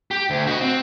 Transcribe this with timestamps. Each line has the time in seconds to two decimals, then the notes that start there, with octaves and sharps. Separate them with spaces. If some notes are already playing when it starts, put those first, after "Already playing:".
0.11 G4
0.30 D2
0.47 F#4 D#5
0.61 C4